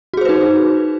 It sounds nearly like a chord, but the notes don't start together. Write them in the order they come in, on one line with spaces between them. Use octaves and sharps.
F#4 G#4 C5 B4 D#4